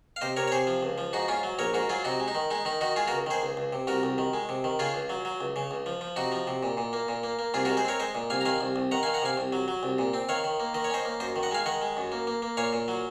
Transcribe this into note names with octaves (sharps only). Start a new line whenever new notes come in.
F5
C3 C5 D#5
C3 A#4 C#5
C#5
C3 G#4 C5
F3
C#2
F3
G#2 D#4 F#4
G#2 C#4 F4
F#3
A#1 A#4 C#5
G#2 F#4 A#4
F#3 F4 G#4
C3 D#4 F#4
G#3
D#4
D#3
G#3 D#4
D#3 D#4
D#3 D#4 F#4
G#3 F4 G#4
F#4 A#4
C#2
D#3 G#4 C5
C#2
C#2
C3
C2 F#4 A#4
C2
D#3
G#3
C3
D#3
C#3 F4 G#4
C#2
F#3
F#3
C#2
C#3
C#2
F3
F3
C3 D#4 F#4
F3
C3
A#2
A#2
A#3
A#2
A#3
A#3
C2 F4 G#4
F#4 A#4
G#3
G#4 C5
C4 A#4 C#5
G#3 C5 D#5
A#2
C2 F5 G#5
A#5
D#3 F5 G#5
C2
C2
D#3 F#5 A#5
F5 G#5
D#3
F#5 A#5
C3 F5 G#5
C2
F#3
F#3
C2
A#2
C4
D#3 C#5 F5
D#3
A#3
D#3 D#5
C#5
C#4 C5 D#5
A#3
F#2 C5 D#5
D#3
D#5 F#5
G#3 F5 G#5
D#3 D#5 F#5
G#3
F#2
A#3
A#3
A#3
A#2 C#5 F5
A#2
F#3